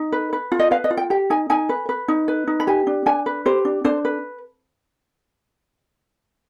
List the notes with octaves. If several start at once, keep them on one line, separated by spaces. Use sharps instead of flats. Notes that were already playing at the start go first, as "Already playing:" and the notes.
Already playing: D#4
B4
B4
F4
D#5
B4 F5
D#5
F4
G5
G4 G5
D#4 G#5
D#4 G#5
B4
B4
D#4
B4
D#4
B5
G4 G#5
D4
D4 G#5
B4
G4 C5
D4
D4 C5
B4